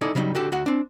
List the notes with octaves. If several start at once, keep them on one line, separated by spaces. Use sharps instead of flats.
D#4 E4 G#4 A4 D5
C#3 F#3 G3 D4 D#4
D3 F#4 G4 A4
D2 F#4 F#5
C4 D4